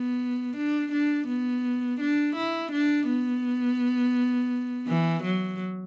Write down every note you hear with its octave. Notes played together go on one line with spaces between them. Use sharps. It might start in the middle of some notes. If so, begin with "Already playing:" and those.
Already playing: B3
D4
D4
B3
D4
E4
D4
B3
E3
F#3